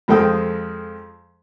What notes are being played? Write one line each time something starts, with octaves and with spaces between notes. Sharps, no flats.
F2 F3 G#3 A4 G5 D#6